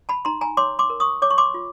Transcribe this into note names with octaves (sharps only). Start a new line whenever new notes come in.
A5 B5
D#4 A#5 C6
G#5 A#5
C#5 C6 D6
C6 D6
A#4
C#6 D#6
C#5 D6
C#6
C6 D6
F4